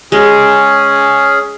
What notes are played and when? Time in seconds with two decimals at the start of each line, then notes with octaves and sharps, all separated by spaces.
0.12 G#3 C#4 G#4